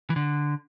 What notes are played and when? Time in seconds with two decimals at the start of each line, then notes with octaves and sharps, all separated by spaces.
0.10 E3
0.16 D3